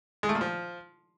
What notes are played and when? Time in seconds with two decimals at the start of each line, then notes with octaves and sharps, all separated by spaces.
0.23 G#3
0.29 A3
0.35 A#2
0.41 F3